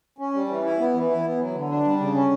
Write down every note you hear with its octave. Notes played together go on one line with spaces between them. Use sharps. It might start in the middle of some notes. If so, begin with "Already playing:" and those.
C#4
G3
E3
E4
B3
E3
E4
B3
F#3
D3
D4
G3
C#3
C#4